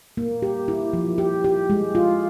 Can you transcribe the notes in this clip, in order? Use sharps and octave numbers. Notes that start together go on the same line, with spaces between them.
A#3
G4
E4
F3
G4
G4
G#3
F4